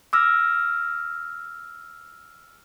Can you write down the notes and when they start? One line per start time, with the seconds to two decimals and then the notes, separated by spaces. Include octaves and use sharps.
0.13 D6 E6 F6 A#6